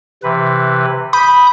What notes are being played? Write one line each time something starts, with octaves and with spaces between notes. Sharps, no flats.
C3 E3 B4
B5 D#6 G6